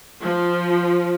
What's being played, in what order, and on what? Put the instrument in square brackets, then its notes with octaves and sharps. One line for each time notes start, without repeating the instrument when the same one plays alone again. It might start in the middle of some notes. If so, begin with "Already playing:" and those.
[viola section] F3